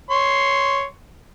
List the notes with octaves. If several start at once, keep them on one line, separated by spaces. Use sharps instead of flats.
C#5 C6